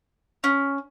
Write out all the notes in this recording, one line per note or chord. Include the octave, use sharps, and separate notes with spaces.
C#4